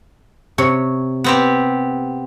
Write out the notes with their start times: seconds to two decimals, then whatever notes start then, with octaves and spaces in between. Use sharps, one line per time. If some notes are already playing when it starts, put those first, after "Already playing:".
0.58 C3 C#5
1.24 B3 C4 G4